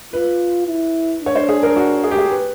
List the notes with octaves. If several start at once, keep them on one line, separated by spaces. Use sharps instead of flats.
F4 B4
E4
D4 C#5
C5
G#4
A#4
F#4
G#4
G4
G#4
B4